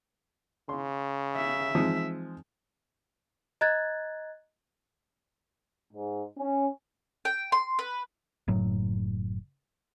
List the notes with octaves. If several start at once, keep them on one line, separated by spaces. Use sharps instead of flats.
C#3 C6
E5
E3 F3 G#3 C4 D#4 D#6
D#5 A#5 F#6 G#6 A6
G#2
C#4
G5
C6
B4
F#1 A2 F#3